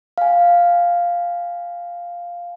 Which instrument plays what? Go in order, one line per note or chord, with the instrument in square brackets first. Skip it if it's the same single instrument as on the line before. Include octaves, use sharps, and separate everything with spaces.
[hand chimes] F5 G#5